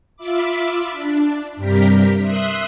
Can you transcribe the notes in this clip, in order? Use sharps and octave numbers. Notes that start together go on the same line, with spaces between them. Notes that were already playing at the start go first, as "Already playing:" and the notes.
F4 E5 B5 D6
D4
G2 C3 G3 G4 A#4 B6
E5 C6 D#6 F#6